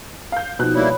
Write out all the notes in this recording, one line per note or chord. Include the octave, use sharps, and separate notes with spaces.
F5 G6
B2 F3 B3 D#4 F#4 F#6
G3 A#3 E4 C#5 B5